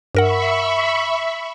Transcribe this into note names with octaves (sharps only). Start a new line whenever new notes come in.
G2 A#4 E5 F#5 B5 C#6